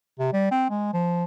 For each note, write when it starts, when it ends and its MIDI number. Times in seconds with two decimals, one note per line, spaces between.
0.19 0.29 48
0.33 0.47 55
0.51 0.67 60
0.70 0.91 56
0.94 1.24 53